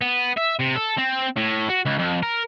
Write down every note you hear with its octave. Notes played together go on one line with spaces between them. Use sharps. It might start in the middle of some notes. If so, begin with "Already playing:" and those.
B3
E5
C3
A4
C4
A2
F#4
C#2
F2
A#4